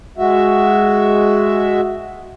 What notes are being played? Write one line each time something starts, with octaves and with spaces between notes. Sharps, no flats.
G#3 F#4 E5